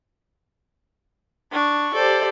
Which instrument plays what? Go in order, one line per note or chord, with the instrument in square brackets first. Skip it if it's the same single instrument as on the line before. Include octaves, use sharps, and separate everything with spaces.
[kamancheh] D4 C#6
[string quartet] G4 C5 D5 [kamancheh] A4